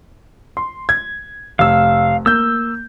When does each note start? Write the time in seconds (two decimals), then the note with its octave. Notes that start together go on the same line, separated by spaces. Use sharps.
0.57 C6
0.89 G#6
1.59 F1 F5 E6
2.26 A#3 E6 G6